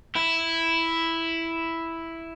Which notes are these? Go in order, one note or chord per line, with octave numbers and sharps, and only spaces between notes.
E4